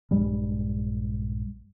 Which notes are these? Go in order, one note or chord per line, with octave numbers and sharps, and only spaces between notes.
A#1 G2 G3 G#3